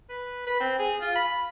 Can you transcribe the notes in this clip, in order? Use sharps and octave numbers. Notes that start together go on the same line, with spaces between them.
B4
B4
C4
G#4
F4
B5